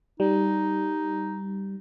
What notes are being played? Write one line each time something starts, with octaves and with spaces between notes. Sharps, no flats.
G3 D#4